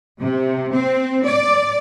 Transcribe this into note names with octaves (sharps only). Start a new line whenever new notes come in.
C3
C4
D5